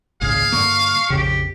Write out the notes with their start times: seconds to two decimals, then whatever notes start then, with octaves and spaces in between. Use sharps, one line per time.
0.22 G#1 C#2 A#2 G#4 F5
0.52 G2 D3 A#3 C#6
1.10 A#1 F2 C#3 G4